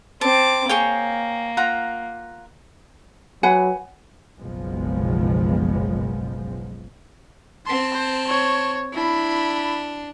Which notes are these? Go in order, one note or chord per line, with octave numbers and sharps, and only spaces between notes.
C4 A5 D6
A#3 G#4 C#5 G5
F4 F#5 A#5
F#3 B4 F#5 G#5
F#1 B1 F3 G#3 B3
C4 A5 C6
C5
C#5
D4 E4 B5